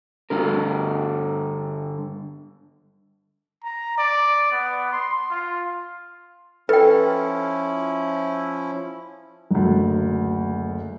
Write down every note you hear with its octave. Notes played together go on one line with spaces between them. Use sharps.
G2 D3 A#4
A#5
D5
B3
C6
F4
F3 C#4 E4 A4 B4 G5
F#1 D2